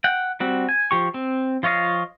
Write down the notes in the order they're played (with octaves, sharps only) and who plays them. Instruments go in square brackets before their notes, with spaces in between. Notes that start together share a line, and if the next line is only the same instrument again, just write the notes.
[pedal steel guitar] F#5 G5
G3 C4 F#4
G#5
F3 G4 C#6
C4
F3 F4 C#5 D#5 F5